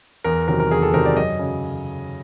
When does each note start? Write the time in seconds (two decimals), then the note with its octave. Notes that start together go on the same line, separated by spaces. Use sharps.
0.24 E2 A#4
0.48 C3 D#3 F#3 A#4
0.60 A#4
0.71 E2 G#4
0.82 A4
0.93 C3 D#3 F#3 A#4
1.05 D5
1.16 F#2 D#5
1.39 C#3 F#3